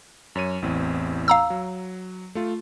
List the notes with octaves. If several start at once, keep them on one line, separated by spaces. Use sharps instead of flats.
F#2 C#5 D#7
A1 E2 C4
F5 A#5 E6
F#3
A3 F4